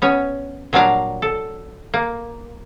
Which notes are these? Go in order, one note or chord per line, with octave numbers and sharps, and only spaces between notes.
B3 C#4 C#5
A#2 F#3 G3 D4 F5 A#5
A4
A#3